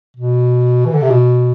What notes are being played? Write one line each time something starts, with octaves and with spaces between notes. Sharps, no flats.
B2
E3
D3
C3
B2